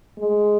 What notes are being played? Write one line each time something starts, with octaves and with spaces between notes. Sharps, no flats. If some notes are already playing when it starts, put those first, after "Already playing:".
G#3